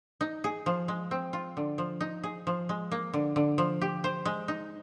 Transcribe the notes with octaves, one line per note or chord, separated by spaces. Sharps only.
D#4
G#4
F3
G#3
C4
F4
D3
F3
D#4
G#4
F3
G#3
A#3
D3
D3
F3
G4
C5
G#3
D#4